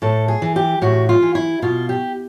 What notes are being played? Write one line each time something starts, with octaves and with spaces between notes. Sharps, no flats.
A2 A4
G#4
E3
G4
A2 F#4
F4
E3
E4
B2 F4
G4